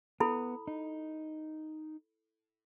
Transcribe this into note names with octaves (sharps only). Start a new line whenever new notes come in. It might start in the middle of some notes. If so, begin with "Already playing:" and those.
B3 E4 A4 B5
D#4